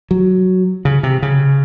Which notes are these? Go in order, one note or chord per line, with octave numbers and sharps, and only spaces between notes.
F#3
C#3
C3
C#3